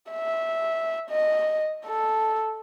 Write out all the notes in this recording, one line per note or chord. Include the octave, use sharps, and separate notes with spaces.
E5
D#5
A4